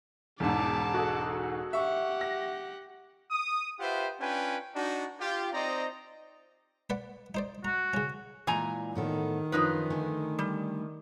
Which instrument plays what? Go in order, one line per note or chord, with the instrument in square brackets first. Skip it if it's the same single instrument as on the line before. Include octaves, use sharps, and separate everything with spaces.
[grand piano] E1 G#2 [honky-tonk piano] E2 [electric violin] A5 D6
[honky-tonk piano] F#4 G#4 A4
[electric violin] G4 F#5 [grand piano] E5 C#6
[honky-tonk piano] A#6
[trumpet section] D#6
F4 G4 B4 C5 E5 F#5
C#4 D4 F4 B4 G5 G#5
D4 D#4 F#4
F4 G4
C4 D#4 C5 D5 D#5 A#5
[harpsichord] B4 D5 F#5
D#4 C5 D5
[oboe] F#4 [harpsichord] A#5
[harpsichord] C#3 C#4
[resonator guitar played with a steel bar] A#2 G#5 A#5 [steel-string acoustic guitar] E3 G#3
[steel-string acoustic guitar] A2 B3 A4 [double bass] D#3
[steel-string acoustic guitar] F#2 F4 C5 [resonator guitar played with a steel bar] F3 D#4 B4
[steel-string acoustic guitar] D3 A3 G#5
[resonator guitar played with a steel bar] G3